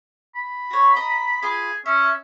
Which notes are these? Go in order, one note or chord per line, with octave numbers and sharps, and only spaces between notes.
B5
F#4 C#5
D#5 A#5
F4 G#4 B5
C#4 E5